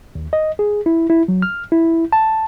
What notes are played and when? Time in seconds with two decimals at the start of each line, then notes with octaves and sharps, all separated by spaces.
0.15 D#2
0.33 D#5
0.59 G#4
0.86 E4
1.10 E4
1.28 F#3
1.42 F6
1.72 E4
2.13 A5